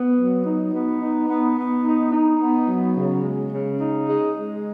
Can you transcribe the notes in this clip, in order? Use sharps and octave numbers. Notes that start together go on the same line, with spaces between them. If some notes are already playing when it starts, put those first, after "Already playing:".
Already playing: B3
F#3
D#4
B3
D#4
B3
B3
D#4
D#4
B3
F#3
C#3
G#3
C#3
D#4
G#3
G#3